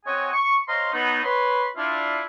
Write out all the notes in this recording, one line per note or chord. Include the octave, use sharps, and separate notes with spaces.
C4 F#4 C#5 D#5 F#5 G#5
C#6
C5 C#5 D#5 F5 A#5 C6
F#3 B3 D#4
B4 C#5 B5 C6
D4 E4 F4